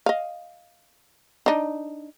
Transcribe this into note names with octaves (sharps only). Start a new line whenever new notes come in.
D#5 F5
D4 D#4